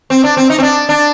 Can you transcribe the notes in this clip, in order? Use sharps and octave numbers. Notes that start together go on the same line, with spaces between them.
C4
D4
C4
D#4
C4
D4
D4